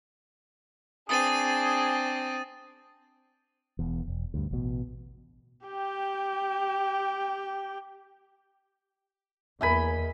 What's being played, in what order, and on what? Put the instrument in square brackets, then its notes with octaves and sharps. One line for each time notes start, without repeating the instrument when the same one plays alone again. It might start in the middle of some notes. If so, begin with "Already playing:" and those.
[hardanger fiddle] C4 [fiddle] D4 [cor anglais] G#4 [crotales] D#6 A6 D#7
[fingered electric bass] E1 E2
E1
D2 G2
A1 B2
[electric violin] G4 G5
[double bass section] E2 [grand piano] A#3 E5 [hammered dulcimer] D#5 G#5 B5